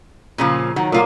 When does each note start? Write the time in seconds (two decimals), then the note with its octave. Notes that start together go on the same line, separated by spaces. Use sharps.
0.38 A#2 C#3 F3
0.76 D#3 F#3
0.92 A#2 F3 A#3 F4